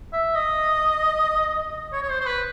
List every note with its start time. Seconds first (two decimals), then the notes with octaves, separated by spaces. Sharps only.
0.13 E5
0.35 D#5
1.93 C#5
2.03 C#5
2.10 C5
2.20 C5
2.26 B4